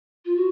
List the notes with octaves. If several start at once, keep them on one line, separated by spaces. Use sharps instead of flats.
F4
F#4